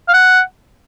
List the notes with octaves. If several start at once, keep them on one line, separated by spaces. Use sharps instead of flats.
F5
F#5